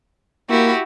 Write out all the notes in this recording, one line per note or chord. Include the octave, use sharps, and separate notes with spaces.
A#3 E4 F#4 G4